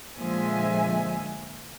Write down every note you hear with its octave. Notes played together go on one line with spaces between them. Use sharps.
A#2 D3 F3 G#3 E5 G#5